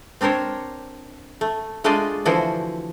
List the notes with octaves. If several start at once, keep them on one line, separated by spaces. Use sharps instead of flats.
C4 D4 A#4 C5 C#5
A3
G#3 A3 D4 F4 D5 D#5
D3 E3 F3 E4 F#4 C5